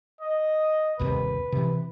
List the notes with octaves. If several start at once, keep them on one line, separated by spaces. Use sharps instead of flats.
D#5
G1 D#2 C3 B4
C3 E3